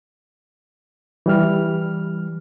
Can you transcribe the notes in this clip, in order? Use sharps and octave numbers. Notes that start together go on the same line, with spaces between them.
E3 G3 F6